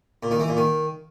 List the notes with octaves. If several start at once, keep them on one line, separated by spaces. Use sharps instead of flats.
A#2
D#3
E3
A#2
D#3